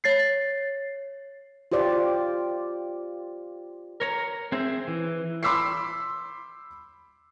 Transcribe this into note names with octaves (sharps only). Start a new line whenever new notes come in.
C#5 A6 C7
F4 G4 C5 D5
A#4 C#5 A#5
C4 G#4 C5 E5
E3
B5 C6 D6 E6 B6 C7